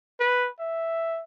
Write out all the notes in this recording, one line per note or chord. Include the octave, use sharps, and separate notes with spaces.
B4
E5